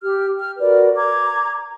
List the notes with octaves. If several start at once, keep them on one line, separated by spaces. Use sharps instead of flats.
G4 F6
F6
F#4 A#4 B4 D5
A#5 D6 G#6